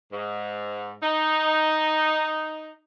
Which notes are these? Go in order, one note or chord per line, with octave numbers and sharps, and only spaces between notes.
G#2
D#4